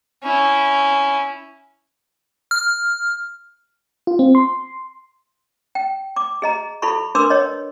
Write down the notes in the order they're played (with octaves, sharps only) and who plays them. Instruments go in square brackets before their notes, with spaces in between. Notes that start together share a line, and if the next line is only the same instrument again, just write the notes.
[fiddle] C#4 E4
[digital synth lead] F6
[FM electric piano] F4
C4
C6
[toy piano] G5
D6
G#4 D#5 A#5
E4 F4 A4 B5 C#6
D4 A#4 B4 C6 D6 E6
C#5 D#5